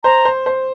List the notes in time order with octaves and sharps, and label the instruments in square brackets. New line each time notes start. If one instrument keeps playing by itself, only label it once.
[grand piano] C5 [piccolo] A#5
[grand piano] C5
C5